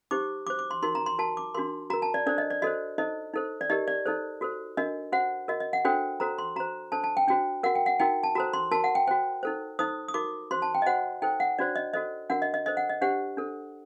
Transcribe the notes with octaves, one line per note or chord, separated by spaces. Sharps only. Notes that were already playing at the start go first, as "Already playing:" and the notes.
D#4 G4 C5 D6
F#4 C5 D6
D6
C6
D#4 F#4 A#4 C6
A#5
C6
F#4 A#4 A5
D6
D4 F#4 A#4 C6
F#4 A#4 A#5
A5
D5
D4 A4 C5 D5
D#5
D5
F#4 A4 C5 D#5
D#4 A4 C5 D#5
D#4 A4 C5
D5
D#4 G4 A#4 D#5
D5
D#4 A4 C5
F#4 A4 C5
D4 F#4 A#4 D#5
F#4 C5 F#5
F#4 A#4 D#5
D#5
F#5
D4 F#4 A4 C5 G5
F#4 A4 C5 A#5
C6
F#4 C5 A#5
D4 A4 C5 A5
A5
G5
D4 F#4 C5 G5
F#4 A#4 F#5
G5
F#5
D#4 F#4 A#4 G5
A5
F#4 A4 C5 A#5
C6
F#4 A#4 A5
F#5
G5
F#4 C5 G5
D#4 A4 C5
D#4 A4 C5 D#6
D#6
D#4 F#4 A#4 D6
F#4 C5 C6
A5
G5
D#5
F#4 C5 F#5
D#4 A4 C5 G5
F#5
D4 F#4 C5 D5
D#5
F#4 A4 C5 D#5
D4 F#4 A#4 F#5
D#5
D#5
D4 A4 C5 D#5
F#5
D#5
D4 G4 C5 F#5
D4 A4 C5